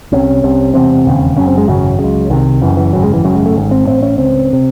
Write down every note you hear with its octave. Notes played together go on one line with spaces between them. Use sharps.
C2 C3 C#4
C2 C3
E1 E2 C3 C4
E1 D#2 C#3
F#1 F#2 C#3 C#4
C4
G#3
G#1 F#2 C#3 F#3
C#3
C#2
C2 C3 D#3
F#1 F#2 C#3 E3
E3
G#1 F#2 C#3 F#3
G#3
E3
G#1 F#2 C#3 F#3
G#3
A3
G#1 G#2
C4
A1 A2 C4
C#4
C#2 C#3 C4
C3